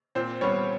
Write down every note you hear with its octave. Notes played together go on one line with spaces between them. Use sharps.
A#2 C4 C5
G3 B3 C#4 C#5